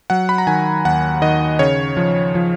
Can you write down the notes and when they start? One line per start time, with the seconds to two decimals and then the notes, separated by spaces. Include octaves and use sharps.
0.10 F#3 F#5
0.29 B5
0.38 A#5
0.47 D#3 G#5
0.85 D#2 F#5
1.22 D#3 D#5
1.59 C#3 C#5
1.97 F3
2.35 F3